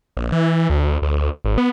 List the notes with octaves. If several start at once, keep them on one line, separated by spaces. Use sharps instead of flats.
A#1
E3
D2
D2
G#1
B3